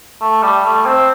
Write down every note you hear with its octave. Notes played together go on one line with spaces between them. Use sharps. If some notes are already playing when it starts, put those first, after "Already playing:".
A3
G3
A3
C4